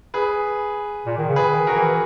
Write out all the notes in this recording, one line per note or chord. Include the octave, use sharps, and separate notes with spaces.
G#4 B4
A#2
D#3
C#3
G#4 B4
D#3
F#4 A#4
E3